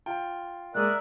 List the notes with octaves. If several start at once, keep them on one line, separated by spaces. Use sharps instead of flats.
F4 G5
A#2 G#3 A#4 D5 E5 D#6 F#6